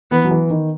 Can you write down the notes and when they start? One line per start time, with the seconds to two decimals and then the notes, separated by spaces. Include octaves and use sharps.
0.12 E3 B3
0.24 F#3
0.31 E3
0.50 D#3